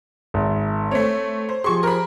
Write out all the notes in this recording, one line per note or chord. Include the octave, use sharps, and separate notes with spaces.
G#1 E5
A3 C4 C#5
C5
F3 G4 G#4 C6 C#6
A#4 C5 B5